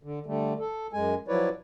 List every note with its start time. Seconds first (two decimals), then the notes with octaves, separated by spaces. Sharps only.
0.03 D3
0.26 D3 G3 A3
0.60 A4
0.93 F#2 G#3 G#5
1.28 F3 F#3 E4 B4 C#5 D5